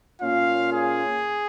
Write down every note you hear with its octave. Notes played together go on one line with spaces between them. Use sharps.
A#2 A#3 C#4 F4 F5
G#4